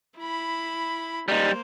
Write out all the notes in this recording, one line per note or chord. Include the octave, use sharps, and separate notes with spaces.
E4 B5
G3 A#3 D#4 C5